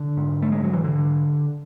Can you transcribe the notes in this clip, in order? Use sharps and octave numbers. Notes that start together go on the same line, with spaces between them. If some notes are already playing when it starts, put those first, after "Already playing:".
Already playing: D3
G#2
A3
G#3
F#3
E3
D3